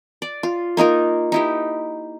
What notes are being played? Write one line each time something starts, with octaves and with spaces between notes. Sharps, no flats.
D5
F4
A#3 D#4 F4 A#4
D#4 E4 G4